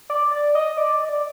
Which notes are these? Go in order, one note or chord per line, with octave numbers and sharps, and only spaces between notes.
D5
D5
D#5
D5
D#5
D5